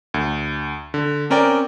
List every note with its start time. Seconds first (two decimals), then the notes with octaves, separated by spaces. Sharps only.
0.14 D2
0.94 D3
1.30 C4 C#4 A#4 D5 G5